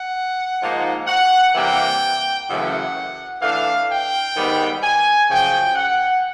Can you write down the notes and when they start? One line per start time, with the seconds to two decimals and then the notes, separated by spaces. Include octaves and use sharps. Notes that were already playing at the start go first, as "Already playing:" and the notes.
Already playing: F#5
0.61 G#2 F3 A#3 D#4
1.08 F#5
1.55 C3 E3 G3 A#3 G5
2.48 F#2 C#3 E3 A3 F#5
3.41 E3 A3 D4 F5
3.88 G5
4.35 G#2 D#3 G3 B3
4.82 G#5
5.29 F#2 C#3 F3 G5
5.75 F#5